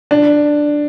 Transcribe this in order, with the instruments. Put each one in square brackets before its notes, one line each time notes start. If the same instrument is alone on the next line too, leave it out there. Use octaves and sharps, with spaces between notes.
[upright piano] D4